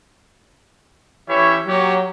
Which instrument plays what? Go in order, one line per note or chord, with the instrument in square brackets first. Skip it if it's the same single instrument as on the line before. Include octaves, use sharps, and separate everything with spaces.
[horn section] E3 E4 C#5 [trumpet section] C#4 G4 E5
[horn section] F#3 [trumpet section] A#3 G4 C#5